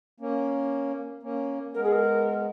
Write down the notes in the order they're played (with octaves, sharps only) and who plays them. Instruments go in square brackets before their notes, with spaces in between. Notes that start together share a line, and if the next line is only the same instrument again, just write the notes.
[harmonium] A#3 C#4
A#3 C#4
[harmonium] G#3 B3 [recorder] A#4
[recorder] G#4
A#4